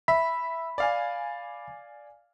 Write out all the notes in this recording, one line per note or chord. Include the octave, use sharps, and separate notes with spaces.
E5 B5
D5 F5 G#5